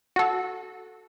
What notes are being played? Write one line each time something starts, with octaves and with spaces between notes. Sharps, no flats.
F#4 A4